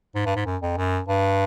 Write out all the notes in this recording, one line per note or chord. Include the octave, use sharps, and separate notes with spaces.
G#2
G2
G#2
F#2
F2
F#2
G2